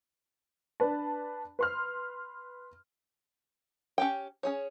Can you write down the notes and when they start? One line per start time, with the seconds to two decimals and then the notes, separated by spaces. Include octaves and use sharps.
0.80 D4 B4 A5
1.59 B4 C6 F6
3.98 C#4 G4 G5
4.43 C#4 G#4 C#5